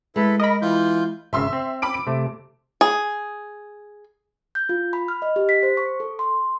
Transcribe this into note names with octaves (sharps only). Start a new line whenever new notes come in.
G#3 E4 A4 B4
A#4 D#5 B5
E3 F4 G6
G#1 C#3 E5 C6 E6
C4
B5 D6 D7
D7
C3 A3
G#4
G6
F4
B5
F6
D#5
G4
B6
C5
C#6
A4
C6